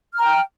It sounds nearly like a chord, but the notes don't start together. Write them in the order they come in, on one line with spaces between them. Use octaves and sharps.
F6 A#5 G5